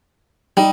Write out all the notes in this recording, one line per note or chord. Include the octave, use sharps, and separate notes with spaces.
G3 D#4